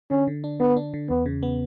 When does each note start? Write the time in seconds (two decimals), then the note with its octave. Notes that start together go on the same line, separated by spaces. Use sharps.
0.11 D3 C#4
0.28 D3
0.44 D4
0.60 D3 B3
0.77 D4
0.94 D3
1.09 E2 B3
1.26 C#3
1.43 B3